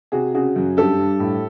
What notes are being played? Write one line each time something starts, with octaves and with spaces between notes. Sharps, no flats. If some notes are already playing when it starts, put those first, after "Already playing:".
C3 F#4 G#4
C#3 F#4 G#4
F#2
G2 G4 A4
G2
A2